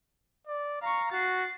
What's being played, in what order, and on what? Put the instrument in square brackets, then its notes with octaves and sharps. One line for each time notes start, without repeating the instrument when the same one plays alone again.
[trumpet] D5
[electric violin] F5 C#6 [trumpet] A#5
[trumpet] F#4 [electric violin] A6 C7